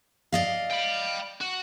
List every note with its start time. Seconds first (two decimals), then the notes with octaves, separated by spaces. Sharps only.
0.32 D5 D#5 F5
0.71 G5 B5
1.41 F#4